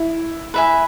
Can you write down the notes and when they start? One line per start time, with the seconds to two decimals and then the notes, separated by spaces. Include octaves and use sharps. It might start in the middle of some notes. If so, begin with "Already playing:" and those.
Already playing: E4
0.54 B4 E5 G#5